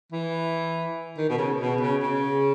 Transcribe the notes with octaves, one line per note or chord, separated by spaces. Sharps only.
E3
D#3
B2
C#3
B2
C#3
C#3